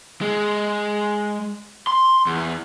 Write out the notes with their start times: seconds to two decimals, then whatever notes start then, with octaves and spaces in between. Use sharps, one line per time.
0.21 G#3
1.87 C6
2.26 E2